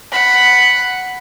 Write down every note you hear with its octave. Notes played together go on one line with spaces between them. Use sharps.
F#5 B5